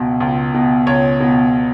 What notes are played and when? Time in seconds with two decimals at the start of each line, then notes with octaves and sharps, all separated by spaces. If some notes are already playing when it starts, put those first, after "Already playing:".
Already playing: C#2 B2
0.20 C#2
0.54 B2
0.87 C#2 C#5
1.20 B2